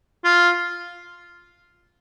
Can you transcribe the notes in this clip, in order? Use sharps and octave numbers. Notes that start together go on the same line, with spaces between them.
F4